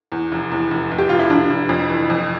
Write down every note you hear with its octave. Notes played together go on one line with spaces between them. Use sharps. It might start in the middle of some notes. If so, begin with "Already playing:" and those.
E2
F1
E2
F1
F1
G4
F1 F4
E4
F1 D4
F1
F2
E3
F2